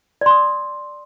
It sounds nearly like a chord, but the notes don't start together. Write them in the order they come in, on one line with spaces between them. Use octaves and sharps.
D5 C6 D#6